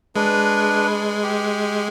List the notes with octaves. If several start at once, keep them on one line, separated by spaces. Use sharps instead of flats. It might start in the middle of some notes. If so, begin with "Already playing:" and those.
G#3 D4 B4
G4